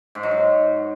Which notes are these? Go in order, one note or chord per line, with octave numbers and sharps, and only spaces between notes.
G#2
F#3
G#2